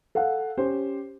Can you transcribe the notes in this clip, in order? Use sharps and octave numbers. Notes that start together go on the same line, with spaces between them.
A4 F5 F#5
C#4 G4 C5